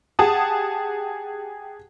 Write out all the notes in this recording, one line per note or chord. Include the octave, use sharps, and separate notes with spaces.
G4 G#4 F#5 A5 D#6